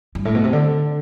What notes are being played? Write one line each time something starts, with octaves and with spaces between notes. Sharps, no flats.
G2
A2
B2
C3
D3